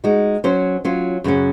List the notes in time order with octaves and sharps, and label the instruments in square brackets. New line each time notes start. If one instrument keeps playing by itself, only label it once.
[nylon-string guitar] G#3 D#4 F#4
F#3 C#4 F#4 C5
F#3 C#4 F4
F#2 C#3 F#3 C#4